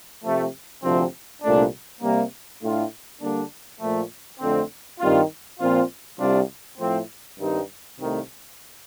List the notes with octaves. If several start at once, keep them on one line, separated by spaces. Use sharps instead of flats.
C3 F3 A3
D2 C3 F3 C4
C2 A#2 A3 D4
C3 G3 A#3
A2 A3 D4 F4
D3 G3 A#3 D4
A#2 F3 A3
F2 D3 A3 C4
G2 D#3 G3 C4 F4
A#2 F3 C4 F4
C2 C3 G3 D4 F4
A2 F3 A3 C4
G2 D#3 G3 C4 D#4
C2 C3 D#3 A3